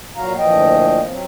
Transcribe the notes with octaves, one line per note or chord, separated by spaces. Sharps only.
A#2 F#3 F#4 F5 A#5
D2 A#2 E3 F3 D#5 G5
F#3 C4